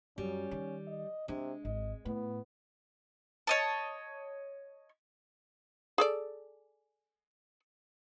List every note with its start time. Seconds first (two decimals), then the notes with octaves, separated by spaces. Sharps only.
0.18 F#2 G3 C#4
0.51 D#3
0.87 D#5
1.28 C3 G#3 D4
1.65 G#1 D#5
2.05 A2 B3
3.47 C#5 D#5 A5
5.98 G#4 A4 D5